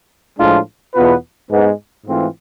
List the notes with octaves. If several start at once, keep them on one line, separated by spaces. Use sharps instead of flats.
A2 F3 G#3 D4 F4
E2 B2 B3 F4 B4
G#2 G#3 B3
G#2 E3 A3 C4 F4